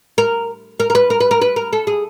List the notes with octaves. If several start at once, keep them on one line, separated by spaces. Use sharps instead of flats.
A#4
A#4
A#4
B4
A#4
B4
A#4
B4
A#4
A4
G#4